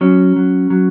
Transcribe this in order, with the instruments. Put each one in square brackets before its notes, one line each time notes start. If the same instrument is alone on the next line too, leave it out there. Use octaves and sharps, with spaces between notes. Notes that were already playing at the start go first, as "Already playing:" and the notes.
[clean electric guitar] F#3 C#4
F#3
F#3